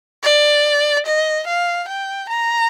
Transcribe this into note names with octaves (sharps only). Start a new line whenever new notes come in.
D5
D#5
F5
G5
A#5